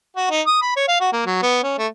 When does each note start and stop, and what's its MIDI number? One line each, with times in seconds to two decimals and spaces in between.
0.17 0.27 66
0.30 0.41 63
0.47 0.59 87
0.62 0.72 83
0.76 0.88 73
0.88 0.99 77
1.00 1.08 66
1.13 1.25 58
1.26 1.42 54
1.42 1.58 59
1.63 1.74 61
1.78 1.87 57